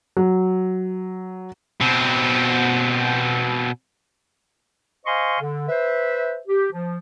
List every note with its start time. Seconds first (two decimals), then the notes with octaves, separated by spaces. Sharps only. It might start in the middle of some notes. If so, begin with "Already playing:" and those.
0.17 F#3
1.81 B2 C4
5.06 C5 D#5 F5 G#5 C6 C#6
5.40 D3
5.69 B4 C5 E5
6.47 G4
6.71 F3